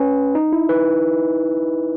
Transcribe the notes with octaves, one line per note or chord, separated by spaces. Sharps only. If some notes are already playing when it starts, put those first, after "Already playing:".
Already playing: C#4 B4
D#4
E4
B4